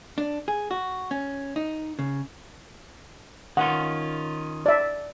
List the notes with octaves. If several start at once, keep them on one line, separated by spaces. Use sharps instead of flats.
D4
G#4
F#4
C#4
D#4
C#3
D#3 C#4 F4 F#5
D5 E5